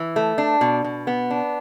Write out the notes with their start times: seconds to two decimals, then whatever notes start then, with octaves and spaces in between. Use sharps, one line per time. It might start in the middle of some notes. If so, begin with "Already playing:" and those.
Already playing: E3
0.16 A3
0.38 D4
0.61 B2
0.84 B2
1.07 B3
1.30 D4